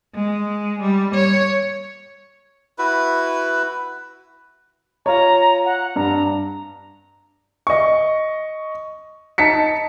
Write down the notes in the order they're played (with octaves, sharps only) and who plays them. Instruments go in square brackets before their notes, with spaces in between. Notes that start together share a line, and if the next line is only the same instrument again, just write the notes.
[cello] G#3
G3
C#5
[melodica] E4 F#4 B4
[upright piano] F4 C#5 [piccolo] A#5
[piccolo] F#5
[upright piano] G2 [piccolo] A#5
[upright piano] D#5 C#6
D#4 A5 B6 C#7